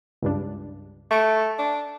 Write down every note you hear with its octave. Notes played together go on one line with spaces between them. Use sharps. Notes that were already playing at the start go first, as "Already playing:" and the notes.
C#2 G2 D4
A3 C#6 D7
D4